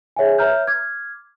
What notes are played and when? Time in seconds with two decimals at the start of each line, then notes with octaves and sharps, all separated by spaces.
0.16 G#4 C#5 E5 F#5 G#5
0.38 B4 C#5 E5 A#5 F6 G6
0.67 D6 F6 G#6